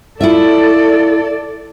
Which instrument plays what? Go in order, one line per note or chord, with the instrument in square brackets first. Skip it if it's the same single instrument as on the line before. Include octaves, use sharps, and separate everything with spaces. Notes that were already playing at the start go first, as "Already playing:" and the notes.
[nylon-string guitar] E4 F4 E5 [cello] A4 D5